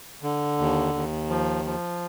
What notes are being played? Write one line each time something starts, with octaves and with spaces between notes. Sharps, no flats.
D3
D#2
D#2
F3
F3